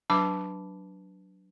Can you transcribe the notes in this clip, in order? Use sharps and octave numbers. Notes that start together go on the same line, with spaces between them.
F#3 D4 B4 A5 B5 D6